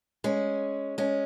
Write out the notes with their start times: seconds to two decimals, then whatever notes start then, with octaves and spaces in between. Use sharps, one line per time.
0.24 G#3 C#4
0.98 G#3 C#4